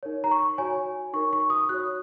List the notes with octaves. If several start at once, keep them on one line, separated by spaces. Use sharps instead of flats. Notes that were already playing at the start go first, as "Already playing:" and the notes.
D#4 A#4 C#5
A#5
C#6
F#4 C#5 G#5
D#4 A#4 C#5 C#6
C#6
D#6
F#4 C#5 F#6